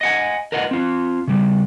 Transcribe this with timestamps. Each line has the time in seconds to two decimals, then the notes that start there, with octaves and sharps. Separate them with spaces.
0.01 D#5 F#5 G#5
0.52 A#4 B4 D#5 F#5
0.71 C4 F4
1.28 C#3 G3